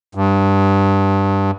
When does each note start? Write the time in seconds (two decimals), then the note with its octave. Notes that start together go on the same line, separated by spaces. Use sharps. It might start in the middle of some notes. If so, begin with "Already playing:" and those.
0.15 G2